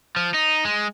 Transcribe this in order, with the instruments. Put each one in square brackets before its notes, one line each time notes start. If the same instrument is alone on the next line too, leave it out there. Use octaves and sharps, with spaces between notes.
[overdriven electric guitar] F3
D#4
G#3